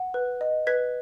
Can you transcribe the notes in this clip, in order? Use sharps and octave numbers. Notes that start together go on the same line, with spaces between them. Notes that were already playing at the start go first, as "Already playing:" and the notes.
Already playing: F#5
B4
D#5
B4 G#6 B6